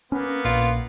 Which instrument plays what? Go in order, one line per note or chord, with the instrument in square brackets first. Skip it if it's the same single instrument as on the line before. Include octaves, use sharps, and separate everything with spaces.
[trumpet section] A#3 B3 [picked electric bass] C#4
[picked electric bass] A#1 A#2 [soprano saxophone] F4